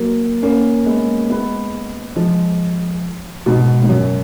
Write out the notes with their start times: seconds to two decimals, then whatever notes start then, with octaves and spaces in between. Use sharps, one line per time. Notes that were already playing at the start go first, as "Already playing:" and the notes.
Already playing: F#3 A#3
0.43 A#3 C#4
0.86 G#3 B3
1.29 G#3 B3
2.16 F3 G#3
3.46 G#2 B2
3.82 G#2
3.89 F#2